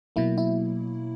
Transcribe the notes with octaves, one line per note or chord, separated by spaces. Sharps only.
B2 F#3 A#3 E4
E4